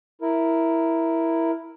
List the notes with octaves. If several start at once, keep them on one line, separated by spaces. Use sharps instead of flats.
E4 A#4